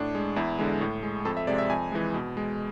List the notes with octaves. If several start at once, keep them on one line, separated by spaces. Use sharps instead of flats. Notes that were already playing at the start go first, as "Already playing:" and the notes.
Already playing: A2 D4
G#3
E2 E4
D3 G#3
A2
G#3
F2 A4
E5
C3 G#3 D5
E5
F2 G#5
E3 G#3
B2
G#3